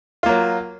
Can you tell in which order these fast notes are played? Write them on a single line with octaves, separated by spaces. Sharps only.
F4 A#3 F#3